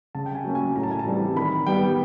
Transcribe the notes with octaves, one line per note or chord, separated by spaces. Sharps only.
C#3 A5
G5
G#5
F#3 A#3 C#4
G#5
A2 A#5
A5
G#5
A5
E3 G3 C4
D#3 B5
G3 B3 G5